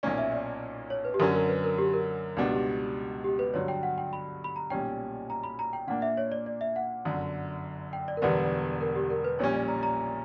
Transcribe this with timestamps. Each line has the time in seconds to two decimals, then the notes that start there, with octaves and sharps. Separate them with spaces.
0.03 B1 A#2 A#3 C#4 D5
0.18 E5
0.32 D5
0.90 C#5
1.05 B4
1.14 G4
1.19 F#2 D3 F#3 C#4 A#4
1.35 A#4
1.49 B4
1.64 A#4
1.78 G4
1.93 A#4
2.37 C#2 B2 G3 B3 D4
2.51 G4
3.24 G4
3.39 B4
3.54 G2 D3 F#3 C#5
3.68 G5
3.83 F#5
3.98 G5
4.13 B5
4.44 B5
4.56 A#5
4.70 B1 A#2 G3 C#4 G5
5.30 A#5
5.43 B5
5.59 A#5
5.73 G5
5.87 A#2 A#3 D4 F#5
6.02 E5
6.17 C#5
6.32 D5
6.46 D5
6.61 E5
6.76 F#5
7.05 G1 F#2 D3
7.93 G5
8.08 D5
8.17 A#4
8.22 E1 E2 D3 G3 B3 B4
8.81 A#4
8.95 G4
9.10 A#4
9.24 B4
9.39 A#1 A#2 G3 C#4 C#5
9.53 D5
9.68 A#5
9.83 A#5